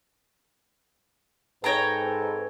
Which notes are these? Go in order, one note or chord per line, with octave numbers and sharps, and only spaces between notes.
G#2 C4 A4 B4 C#5 G5 A#5